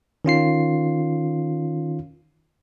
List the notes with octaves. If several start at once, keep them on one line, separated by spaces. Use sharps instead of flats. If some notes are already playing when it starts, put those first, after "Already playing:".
D#3 C#4 F4 C7